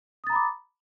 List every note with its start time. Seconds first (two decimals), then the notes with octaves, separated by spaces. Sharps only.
0.24 D#6
0.27 A6
0.30 A#5
0.33 B5
0.36 D6